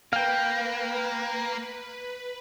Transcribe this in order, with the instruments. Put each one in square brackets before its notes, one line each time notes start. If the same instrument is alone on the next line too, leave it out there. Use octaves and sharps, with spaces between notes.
[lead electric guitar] A#3 [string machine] B4 [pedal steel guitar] F5 G5